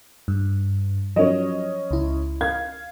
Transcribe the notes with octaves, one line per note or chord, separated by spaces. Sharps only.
G2
F3 F#3 C#4 D#5
C#2 E4
F5 G#6